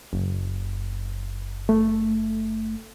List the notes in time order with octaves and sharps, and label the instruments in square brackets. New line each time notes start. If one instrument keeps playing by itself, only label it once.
[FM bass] F#1
[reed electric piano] A3